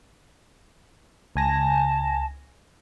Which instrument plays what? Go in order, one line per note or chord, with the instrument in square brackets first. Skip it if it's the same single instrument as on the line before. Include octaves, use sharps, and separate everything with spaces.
[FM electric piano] C#2 G#5 A#6 [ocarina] A5